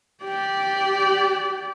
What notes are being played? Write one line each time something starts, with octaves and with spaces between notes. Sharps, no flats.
G4 D5